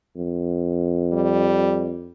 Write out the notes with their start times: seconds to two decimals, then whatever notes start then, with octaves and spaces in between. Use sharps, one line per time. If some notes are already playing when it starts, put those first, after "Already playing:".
0.16 F2
1.13 G3